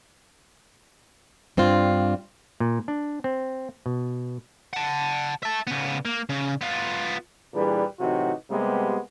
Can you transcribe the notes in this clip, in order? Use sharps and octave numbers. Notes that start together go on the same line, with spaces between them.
G2 C4 D4 F4
A#2
D4
C4
B2
F#5 A5
E5 A5
C#3 B3
A#3
C#3
B3 F4
A#2 E3 G3 D4 G#4 B4
A2 C3 E3 F#3 D#4 F#4
C3 G3 G#3 A#3 B3